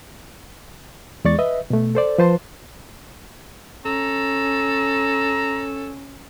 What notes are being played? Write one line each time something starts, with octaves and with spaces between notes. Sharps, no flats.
E2 G#3 D5 C#6 A6
B4 D#5 E5
B2 A3
A4 C5 D5
F3 B4 C5 A5 C6
C#4 A4 A#5